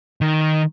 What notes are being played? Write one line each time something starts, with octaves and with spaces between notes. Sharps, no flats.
D#3